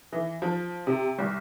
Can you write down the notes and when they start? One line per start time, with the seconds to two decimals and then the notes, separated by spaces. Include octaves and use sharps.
0.13 E3
0.42 F3
0.87 C3
1.19 C2